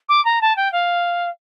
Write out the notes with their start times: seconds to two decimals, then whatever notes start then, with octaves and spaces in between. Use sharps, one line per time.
0.09 D6
0.25 A#5
0.41 A5
0.56 G5
0.72 F5